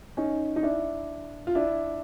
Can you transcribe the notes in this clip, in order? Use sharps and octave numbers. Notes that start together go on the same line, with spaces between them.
C#4 D#4
D#4
D4 E4
F4
D4 E4